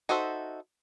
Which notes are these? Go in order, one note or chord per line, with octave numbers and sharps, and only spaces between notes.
D#4 F#4 A4 C5 E5